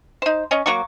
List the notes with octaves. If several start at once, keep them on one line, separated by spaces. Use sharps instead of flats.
D#4 C5
C#4 C#5 D#5
F#3 A#3 F#4 C#6